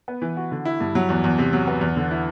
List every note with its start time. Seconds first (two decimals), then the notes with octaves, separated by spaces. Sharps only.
0.08 B3
0.22 E3
0.37 F#4
0.51 D3
0.65 E4
0.80 G2
0.95 F#3
1.09 E2
1.24 E2
1.38 C3
1.53 F#3
1.68 B3
1.81 E2
1.96 D3
2.11 E4